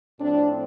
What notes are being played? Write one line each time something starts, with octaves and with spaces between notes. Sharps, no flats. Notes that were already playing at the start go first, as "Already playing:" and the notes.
A2 F3 C4 D4